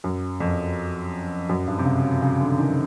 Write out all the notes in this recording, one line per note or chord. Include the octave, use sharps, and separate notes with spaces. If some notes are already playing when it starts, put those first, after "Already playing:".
F#2
F2
F#2
G2
C3
C#3
C#3
C#3
D3
D#3